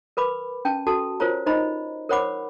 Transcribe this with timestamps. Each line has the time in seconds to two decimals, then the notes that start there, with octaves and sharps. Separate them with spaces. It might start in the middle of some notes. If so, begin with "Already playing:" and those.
0.17 A#4 B4 B5 D6
0.65 C#4 G5 A5
0.87 F#4 A4 A5
1.20 F4 A#4 C5 C#5 A#5
1.46 D#4 C5 D#5 A#5 B5
2.09 A#4 C5 C#5 F#5 B5 D6